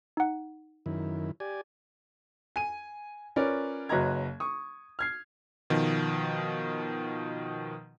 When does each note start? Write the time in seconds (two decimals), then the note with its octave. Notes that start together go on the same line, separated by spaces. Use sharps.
0.17 D#4 F#5
0.86 F#2 D#3 E4
1.40 G4 D5 G#5
2.56 G#5 D#7
3.36 C#4 F4 A#4 B4 D5
3.89 F#1 F#3 B4 D#5 A#5 G#6
4.40 C#6 D#6
4.99 F6 G#6 C7
5.70 B2 D#3 F3